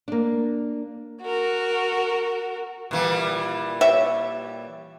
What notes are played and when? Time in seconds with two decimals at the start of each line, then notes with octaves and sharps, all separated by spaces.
0.08 A#3 D4
1.22 F#4 A#4
2.91 A#2 E3 G3
3.81 G4 C#5 E5